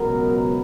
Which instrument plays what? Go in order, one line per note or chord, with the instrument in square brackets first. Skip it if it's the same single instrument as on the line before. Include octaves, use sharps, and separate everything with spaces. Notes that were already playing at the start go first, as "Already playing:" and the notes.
Already playing: [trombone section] C#2 B2 F#3 B3 A#4